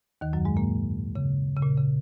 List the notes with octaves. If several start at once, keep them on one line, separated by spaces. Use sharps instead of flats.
D#2 D#3
F#2 F#3
G#2 G#3
A#2 A#3
C#3
C#3
A#2
C#3